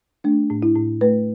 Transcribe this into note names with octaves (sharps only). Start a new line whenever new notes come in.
A3 D4
A2
E4
A2
A3 B4